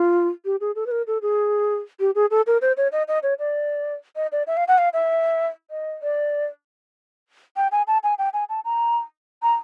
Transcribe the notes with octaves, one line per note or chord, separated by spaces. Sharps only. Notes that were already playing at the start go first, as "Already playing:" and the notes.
Already playing: F4
G4
G#4
A4
B4
A#4
A4
G#4
G4
G#4
A4
A#4
C5
C#5
D#5
D#5
C#5
D5
D#5
D5
E5
F5
F#5
F5
E5
D#5
D5
G5
G#5
A5
G#5
G5
G#5
A5
A#5
A#5